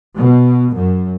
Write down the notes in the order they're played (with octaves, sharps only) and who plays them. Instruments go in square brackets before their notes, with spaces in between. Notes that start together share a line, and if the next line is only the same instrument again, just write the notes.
[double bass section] B2
F#2